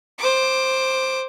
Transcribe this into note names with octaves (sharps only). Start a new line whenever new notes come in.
C5 D6